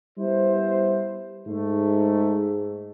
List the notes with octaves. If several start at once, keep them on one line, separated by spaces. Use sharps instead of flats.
G3 B3 E4 C5
G#2 A3